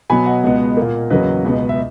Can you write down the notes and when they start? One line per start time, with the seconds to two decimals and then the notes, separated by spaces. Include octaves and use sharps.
0.10 B2 F#3 B3 G#5 B5
0.26 D#5 F#5
0.44 C#2 B2 G#3 B3
0.77 A#2 A#3
1.10 E2 C#3 F#3 A#3 B4 D#5
1.45 C#2 B2 G#3 B3
1.69 E5